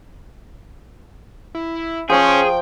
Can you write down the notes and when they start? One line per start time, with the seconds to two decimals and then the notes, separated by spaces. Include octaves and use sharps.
1.55 E4
2.10 F3 C#4 G#4 G5 C#6